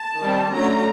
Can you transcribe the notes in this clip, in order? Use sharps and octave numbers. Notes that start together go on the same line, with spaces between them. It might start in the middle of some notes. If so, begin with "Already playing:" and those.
Already playing: A5
D#3 G3 C4
D3 F#3 A3 C#4 A#5